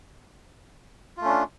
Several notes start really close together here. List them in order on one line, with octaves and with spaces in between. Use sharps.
F4 A3 C#4 D4